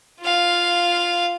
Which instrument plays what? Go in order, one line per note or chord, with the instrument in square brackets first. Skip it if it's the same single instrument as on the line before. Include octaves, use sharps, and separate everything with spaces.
[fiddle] F4 F5